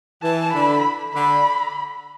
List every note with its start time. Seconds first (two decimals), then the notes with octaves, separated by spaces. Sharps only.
0.23 E3 A5
0.53 D3 B5
1.14 D3 B5